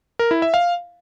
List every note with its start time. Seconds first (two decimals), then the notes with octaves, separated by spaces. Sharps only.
0.19 A#4
0.31 E4
0.42 E5
0.54 F5